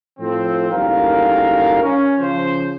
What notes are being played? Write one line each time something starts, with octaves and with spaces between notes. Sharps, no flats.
A2 F3 C4
F#1 D2 G3 D#4 A#4 F5
C#4
C#3 F3 F4 C5